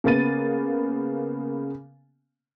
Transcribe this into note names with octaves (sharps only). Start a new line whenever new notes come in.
C#3 A#3 B3 A6 D#7